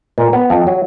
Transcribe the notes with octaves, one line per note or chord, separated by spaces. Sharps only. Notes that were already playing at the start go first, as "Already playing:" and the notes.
A#2
B3
F2
F#3